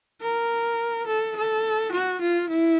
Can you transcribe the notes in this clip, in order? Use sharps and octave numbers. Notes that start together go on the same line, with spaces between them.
A#4
A4
A4
F#4
F4
E4